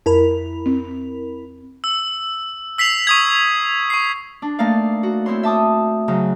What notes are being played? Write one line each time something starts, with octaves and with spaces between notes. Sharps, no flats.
F2 E4 A#4 B5
C4
E6
E6 B6 C7 F7
C#6 D#6 G#6
C#6 C7
D4
A3 A#3 D#4 D5 F5
F#4
C4 E4 C#5 C6
E5 A5 D6 D#6
C#3 F#3 D#4